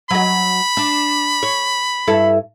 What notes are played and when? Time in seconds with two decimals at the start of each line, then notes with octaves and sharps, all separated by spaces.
0.11 F#3 D#5 B5
0.77 D4
1.43 C#5
2.08 G2 E4 A4